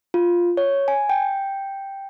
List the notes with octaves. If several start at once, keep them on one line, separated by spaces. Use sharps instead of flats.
F4
C#5
G#5
G5